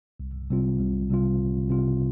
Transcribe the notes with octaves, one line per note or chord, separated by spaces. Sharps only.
C2
C3 G3 C4 F4
C2
C3 G3 C4 F4
C2
C3 G3 C4 F4